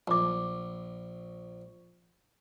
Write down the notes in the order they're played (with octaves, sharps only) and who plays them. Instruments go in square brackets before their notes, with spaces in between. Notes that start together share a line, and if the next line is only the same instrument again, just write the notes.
[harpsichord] A#1 [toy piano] B5 D6